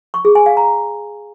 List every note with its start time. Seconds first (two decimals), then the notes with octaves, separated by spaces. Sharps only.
0.14 C#6
0.25 G#4
0.35 G#5
0.46 F5
0.57 A#5